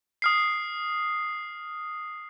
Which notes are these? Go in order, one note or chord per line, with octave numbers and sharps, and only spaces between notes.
D#6 F6 C7